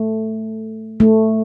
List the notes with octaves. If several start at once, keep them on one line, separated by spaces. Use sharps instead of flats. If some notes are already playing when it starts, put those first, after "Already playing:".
Already playing: A3
A3